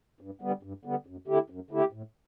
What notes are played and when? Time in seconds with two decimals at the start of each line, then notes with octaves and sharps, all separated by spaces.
0.21 G2
0.42 D3 G3 B3
0.63 G2
0.85 D3 G3 B3
1.06 F#2
1.28 D3 A3 E4 G4
1.50 F#2
1.71 D3 A3 E4 G4
1.92 A2